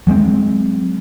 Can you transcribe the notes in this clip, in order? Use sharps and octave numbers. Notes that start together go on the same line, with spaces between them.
F#3 G#3 A#3 C4